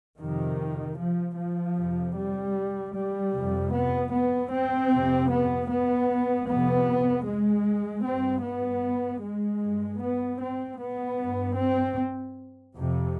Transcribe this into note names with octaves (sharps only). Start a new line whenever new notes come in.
F2 C3 D#3
F3
F3
F2 C3
G3
G3
F2 C3
B3
B3
C4
F2 C3
B3
B3
F2 C3 B3
G#3
G2 C4
B3
G#3
G2
B3
C4
B3
G2
C4
F2 C3